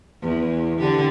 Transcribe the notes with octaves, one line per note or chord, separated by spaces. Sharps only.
E2
D3 G4